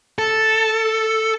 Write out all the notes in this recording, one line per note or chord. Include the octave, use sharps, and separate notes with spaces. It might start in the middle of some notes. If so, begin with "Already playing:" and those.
A4